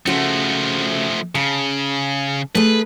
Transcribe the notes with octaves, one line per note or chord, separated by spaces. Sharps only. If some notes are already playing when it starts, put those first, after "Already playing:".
C#3 F3 A3 F#4 C5
C#3 A5
A3 G#4 B4